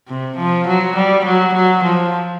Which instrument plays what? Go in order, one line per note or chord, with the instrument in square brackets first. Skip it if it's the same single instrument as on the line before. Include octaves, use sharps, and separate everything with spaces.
[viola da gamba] C3
F3
F#3
G3
F#3
F#3
F3